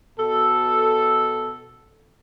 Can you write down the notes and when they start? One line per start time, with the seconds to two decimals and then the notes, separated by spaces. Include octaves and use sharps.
0.18 B2 A4